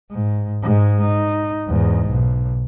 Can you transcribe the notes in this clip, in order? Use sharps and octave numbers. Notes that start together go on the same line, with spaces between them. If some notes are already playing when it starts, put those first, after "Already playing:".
G#2
G#2 G#3
D#4
E2 G#2
B1